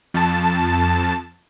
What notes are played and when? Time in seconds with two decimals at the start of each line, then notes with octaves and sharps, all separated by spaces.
0.14 F2 A5